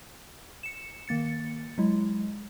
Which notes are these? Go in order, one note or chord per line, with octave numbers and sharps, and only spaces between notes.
C#7 E7
D#3 A#3 A6 C#7
F#3 G#3 E4